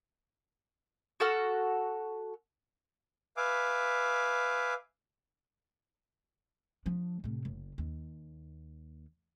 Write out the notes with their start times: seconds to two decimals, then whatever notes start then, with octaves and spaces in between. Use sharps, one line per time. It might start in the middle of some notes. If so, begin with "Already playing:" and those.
1.20 F#4 A4 F#5 F6
3.37 B4 E5 F5 G#5 D6
6.86 F3 D4
7.24 A2 C3
7.45 F#1
7.78 D#2